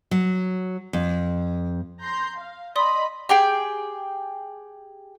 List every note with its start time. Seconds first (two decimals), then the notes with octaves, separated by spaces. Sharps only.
0.11 F#3
0.93 F2
2.01 A#5 C6 G6
2.37 F5
2.76 D5 D#5 B5 C6 D#6
3.29 G4 G#4 G5